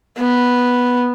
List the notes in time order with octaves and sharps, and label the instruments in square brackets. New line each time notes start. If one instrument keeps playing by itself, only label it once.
[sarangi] B3